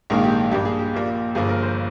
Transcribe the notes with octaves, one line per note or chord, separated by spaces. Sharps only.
A#1 G#2 D#3 A#3 G#4
G4
G2 G3 A#3 G4
G#4
G4
A#1 A#2 G3 A#3
G1 G2 F3 A#3 G#4
A#4
C5